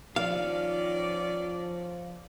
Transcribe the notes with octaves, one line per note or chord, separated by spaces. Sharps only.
D#3 F3 C#4 D5 F5